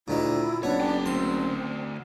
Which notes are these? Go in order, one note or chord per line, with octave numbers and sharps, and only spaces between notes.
D2 A#2 D#3 E4
F#1 B3 D4 C#5
G#4 G5
D2 C4 C6